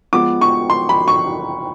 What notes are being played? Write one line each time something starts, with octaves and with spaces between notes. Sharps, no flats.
F3 G#3 B3 D6
C#6
C6
B5
C#6